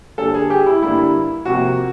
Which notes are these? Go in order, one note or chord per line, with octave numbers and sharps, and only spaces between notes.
G2 D3 G3 A#3 A4
G#4
G4
E4
G2 D3 G3 A#3 E4
C3 F3 A#3 F#4